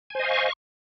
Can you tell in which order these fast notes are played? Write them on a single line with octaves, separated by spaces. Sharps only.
G#5 C5 D#5 F5 C#6